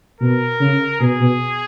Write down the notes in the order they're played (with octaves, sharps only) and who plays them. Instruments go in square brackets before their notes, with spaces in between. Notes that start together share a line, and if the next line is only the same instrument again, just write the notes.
[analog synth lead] B2 [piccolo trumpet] A#4
[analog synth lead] C#3
[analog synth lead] B2 [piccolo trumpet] G#4
[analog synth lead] B2